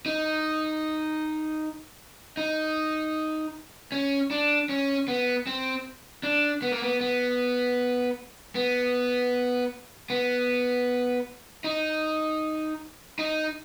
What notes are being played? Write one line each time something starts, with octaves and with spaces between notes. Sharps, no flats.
D#4
D#4
C#4
D4
C#4
B3
C4
D4
B3
A#3
B3
B3
B3
B3
D#4
D#4